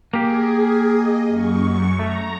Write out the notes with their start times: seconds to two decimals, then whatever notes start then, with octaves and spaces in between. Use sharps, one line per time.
0.13 A#3 G4 G#4
0.92 D#5
1.27 F#2 C#6
1.99 A3 A#5